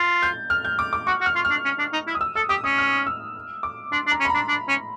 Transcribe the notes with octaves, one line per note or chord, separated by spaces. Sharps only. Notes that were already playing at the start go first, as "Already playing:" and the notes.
Already playing: F4 A6
G6
F6
G6
D6
D6
F#4 C#6
F#4
F6
F4
F6
D4
C#4
D4
D#4
E4
D#6
E6
A4 E6
G4 D#6
C#4 D#6
F6
E6
D6
D4 C6
D4
A#5
C#4
B5
D4 A#5
D4
C#4